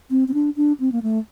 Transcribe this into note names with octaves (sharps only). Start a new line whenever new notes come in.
C4
C4
D4
D4
C4
A#3
A3